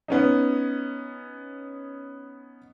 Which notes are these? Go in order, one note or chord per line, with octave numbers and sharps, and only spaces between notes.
B3 C#4 D#4